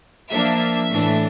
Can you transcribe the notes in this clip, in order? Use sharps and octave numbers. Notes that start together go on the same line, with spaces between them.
F3 A#3 D4 E5
E5
A2 E3 A3 D4